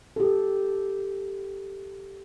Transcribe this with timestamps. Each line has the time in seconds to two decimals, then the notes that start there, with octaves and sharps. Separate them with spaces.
0.16 G4 A4